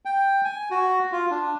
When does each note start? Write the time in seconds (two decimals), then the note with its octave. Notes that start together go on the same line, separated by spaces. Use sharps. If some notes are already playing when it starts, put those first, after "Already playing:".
0.05 G5
0.45 G#5
0.71 F#4
1.12 F4
1.31 D4